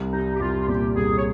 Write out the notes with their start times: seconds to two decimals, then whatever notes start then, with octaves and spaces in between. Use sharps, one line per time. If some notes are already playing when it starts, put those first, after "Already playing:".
Already playing: C2
0.12 G3 D#4
0.35 G4
0.40 C2 F4
0.60 F4
0.68 A#2 G4
0.96 C2 G#4
1.17 C#5